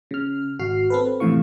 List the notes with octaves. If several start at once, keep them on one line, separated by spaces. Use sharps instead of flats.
C#3 F6
G#1 F#4 F6 C7
C4 A4 B4
F2 A2 C3 E3 F5 C#6